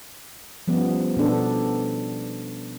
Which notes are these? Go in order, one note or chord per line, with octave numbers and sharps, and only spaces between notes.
F3 G3 B3 C#4
B2 B3 D4 A4